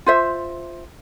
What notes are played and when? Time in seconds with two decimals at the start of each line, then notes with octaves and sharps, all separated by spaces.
0.06 F4 C5 E5